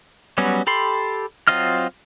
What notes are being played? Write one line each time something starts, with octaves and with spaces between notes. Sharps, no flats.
F#3 G3 B3 C#4 F#4
G4 A4 B5 C6
F#3 C4 F4 D#5 F6